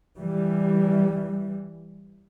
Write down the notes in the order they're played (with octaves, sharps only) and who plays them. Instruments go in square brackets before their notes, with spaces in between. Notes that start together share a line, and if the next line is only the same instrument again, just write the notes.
[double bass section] E3 G3